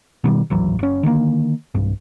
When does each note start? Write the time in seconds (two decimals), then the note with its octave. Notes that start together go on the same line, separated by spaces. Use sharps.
0.24 B2 D#3 G3
0.50 D1 G#1 E3 F#3
0.79 F#1 C#4
1.03 D3 D#3 A3 A#3
1.74 B1 G2